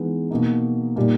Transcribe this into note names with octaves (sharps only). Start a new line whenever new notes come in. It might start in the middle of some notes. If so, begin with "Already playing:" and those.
Already playing: E3 G#3 B3 D#4
B2 A#3 D#4
A#2 G3 A#3 D#4